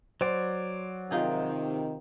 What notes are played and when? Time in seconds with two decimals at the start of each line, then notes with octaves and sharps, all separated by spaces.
0.21 F#3 C5 D5
1.11 C3 D#3 F3 D#4 G#4